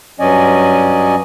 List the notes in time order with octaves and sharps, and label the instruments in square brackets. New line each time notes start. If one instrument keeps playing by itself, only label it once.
[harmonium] G2 F#3 C#4 D5 D#5 G#5